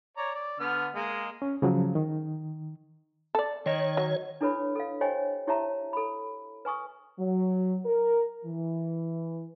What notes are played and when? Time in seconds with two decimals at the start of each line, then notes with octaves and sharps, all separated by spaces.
0.17 C#5 D5 A#5
0.34 D5
0.60 D3 B3 F6
0.95 G#3 A#3 D#5
1.42 C#4
1.62 C#3 F3 F#3
1.95 D#3
3.35 A4 D5
3.66 D#3 C#5 D#5
3.97 F#3
4.41 D4 E4 A4 B4 C#5 B5
4.75 A4 F5
5.01 G4 C5 C#5 D#5 G5 G#5
5.47 E4 G4 C#5 E5 A5 A#5
5.93 A4 B5
6.65 B4 G#5 C#6 D#6
7.19 F#3
7.85 A#4
8.45 E3